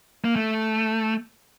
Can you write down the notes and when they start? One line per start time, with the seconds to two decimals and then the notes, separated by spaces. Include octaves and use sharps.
0.24 A#3
0.36 A3